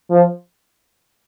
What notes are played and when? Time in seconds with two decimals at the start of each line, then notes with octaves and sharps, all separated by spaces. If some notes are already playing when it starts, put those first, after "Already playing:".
0.11 F3